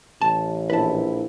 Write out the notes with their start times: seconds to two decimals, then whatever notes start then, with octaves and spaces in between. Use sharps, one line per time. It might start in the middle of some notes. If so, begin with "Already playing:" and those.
0.22 A1 A5
0.70 A#1 E4 B4 A5